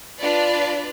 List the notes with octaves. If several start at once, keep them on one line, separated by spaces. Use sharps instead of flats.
D4 F4 B4 D5